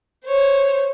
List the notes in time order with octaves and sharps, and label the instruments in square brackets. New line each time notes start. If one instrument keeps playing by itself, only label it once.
[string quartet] C5 C#5